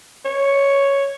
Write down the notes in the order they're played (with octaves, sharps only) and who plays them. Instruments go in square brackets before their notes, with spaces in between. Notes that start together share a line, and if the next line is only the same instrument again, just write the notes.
[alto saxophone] C#5